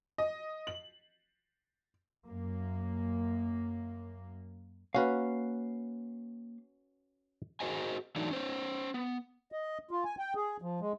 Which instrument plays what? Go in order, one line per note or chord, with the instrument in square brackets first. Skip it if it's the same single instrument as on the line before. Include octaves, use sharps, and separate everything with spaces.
[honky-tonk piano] D#5
F#7
[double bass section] F#2 A#3
[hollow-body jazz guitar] A#3 F5 [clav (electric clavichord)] C#4 F#4 B4
[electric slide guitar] F#4 G#4 A#4 C5 D#5 G#5
E3 F#3 A3 D4 D#4
C#4 C5 C#5
B3
[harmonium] D#5
F4
G#5
G5
G#4
F3
G#3